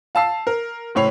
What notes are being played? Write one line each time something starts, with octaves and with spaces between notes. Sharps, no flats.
F5 A5 E6 C7
A#4
F#1 A2 C#5 C7 F7